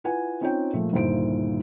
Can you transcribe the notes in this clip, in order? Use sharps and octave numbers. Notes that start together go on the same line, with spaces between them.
E4 F4 B4 F#5 G#5
C4 C#4 D#4 F4 C#5 G5
A#2 F3 G#3 A3
G1 D#2 A#2 E4 C5 D7